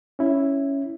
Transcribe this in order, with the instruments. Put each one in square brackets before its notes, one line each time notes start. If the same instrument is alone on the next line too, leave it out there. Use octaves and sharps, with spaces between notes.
[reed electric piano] C#4 E4